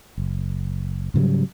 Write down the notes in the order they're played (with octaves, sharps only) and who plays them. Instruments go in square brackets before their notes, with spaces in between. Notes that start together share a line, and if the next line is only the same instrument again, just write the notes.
[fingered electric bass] F#1
G#2 C#3 F#3 G3